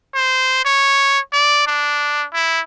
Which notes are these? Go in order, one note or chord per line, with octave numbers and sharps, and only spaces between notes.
C5
C#5
D5
D4
E4